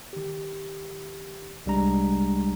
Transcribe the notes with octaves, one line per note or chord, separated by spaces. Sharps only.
D#3 G4
C2 G3 G#3 D4 A#5